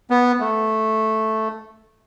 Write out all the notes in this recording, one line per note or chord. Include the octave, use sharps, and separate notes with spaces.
B3
A3